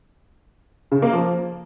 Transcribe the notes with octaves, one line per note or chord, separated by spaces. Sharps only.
C#3
A#3
F3